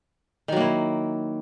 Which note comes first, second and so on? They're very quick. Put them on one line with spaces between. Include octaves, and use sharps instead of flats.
D#3 F#3 A#3 E4